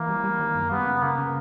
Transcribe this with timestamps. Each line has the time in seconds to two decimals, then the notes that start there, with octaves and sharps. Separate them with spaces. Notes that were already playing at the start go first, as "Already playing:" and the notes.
Already playing: E3 A#3
0.09 G3
0.24 G3
0.39 D#3
0.55 F#2
0.71 G3 B3
0.87 C#3
1.02 C#3 A#3
1.18 C#3